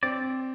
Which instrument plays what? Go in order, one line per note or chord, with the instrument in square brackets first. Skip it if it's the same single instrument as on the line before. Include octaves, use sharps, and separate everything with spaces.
[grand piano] C4 [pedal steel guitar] D5